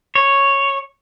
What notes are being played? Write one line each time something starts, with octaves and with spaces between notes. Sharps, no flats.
C#5